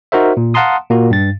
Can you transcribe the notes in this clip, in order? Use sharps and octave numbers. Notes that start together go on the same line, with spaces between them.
D#4 F#4 A#4 C5 E5
A#2
F5 F#5 A5 A#5 C6 D#6
A#2 A#3 F#4
G2 A6